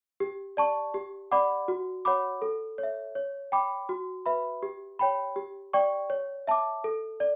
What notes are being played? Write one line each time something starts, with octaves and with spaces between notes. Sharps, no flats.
G4
D5 A5 C#6
G4
D5 F#5 B5 D6
F#4
C#5 F#5 B5 D6
A4
C#5
E5
C#5
G5 B5 D6
F#4
B4 E5 B5
G4
C#5 G5 B5
G4
D5 G5 C#6
C#5
E5 A5 D6
A4
D5